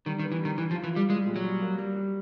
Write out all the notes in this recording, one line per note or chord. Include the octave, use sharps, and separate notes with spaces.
D#3 G3
D#3
B3
E3
D#3 G3
E3 G3
F3
F4
E3
G3 F4
G3 G#3
A#2
F#3
G3
A#3
G3
G3